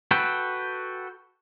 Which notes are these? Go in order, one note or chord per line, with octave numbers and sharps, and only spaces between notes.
F#4 A4 B4 G5